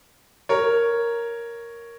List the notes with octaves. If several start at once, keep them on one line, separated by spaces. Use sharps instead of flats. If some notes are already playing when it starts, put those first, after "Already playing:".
A#4 C#5